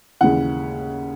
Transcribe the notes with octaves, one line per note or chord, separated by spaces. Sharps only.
D#2 C#3 E3 F#5